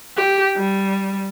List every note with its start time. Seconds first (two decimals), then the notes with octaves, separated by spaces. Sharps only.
0.17 G4
0.57 G3